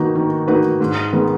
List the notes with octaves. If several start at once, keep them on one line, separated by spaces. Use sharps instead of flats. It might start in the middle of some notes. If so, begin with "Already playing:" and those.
Already playing: D#3 A#3 D#4 F#4 B4
D#3
A#3 D#4 F#4 B4
G#2
D#3 G#3 B3